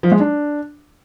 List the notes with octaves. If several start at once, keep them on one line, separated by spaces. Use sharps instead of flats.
F3
G#3
D4